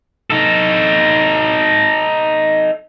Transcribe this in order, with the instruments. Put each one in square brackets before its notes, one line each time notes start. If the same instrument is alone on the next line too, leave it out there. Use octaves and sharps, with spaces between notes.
[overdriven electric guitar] D#4 A4